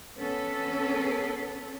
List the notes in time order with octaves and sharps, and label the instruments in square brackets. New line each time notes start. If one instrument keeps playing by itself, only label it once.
[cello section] B3 C#4 A4